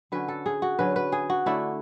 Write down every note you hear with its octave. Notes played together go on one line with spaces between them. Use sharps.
D3 F#3 C#4 B4
A4
G#4
F#4
D3 F#3 C#4 B4
B4
G#4
F#4
D3 A3 D4 E4